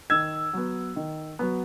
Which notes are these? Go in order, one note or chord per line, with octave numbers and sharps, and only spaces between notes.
D#3 E6 G#6
F#3 B3
D#3
F#3 B3